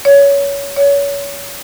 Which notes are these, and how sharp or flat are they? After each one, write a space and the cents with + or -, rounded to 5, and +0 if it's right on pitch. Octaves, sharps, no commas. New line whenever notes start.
C#5 +20
C#5 +30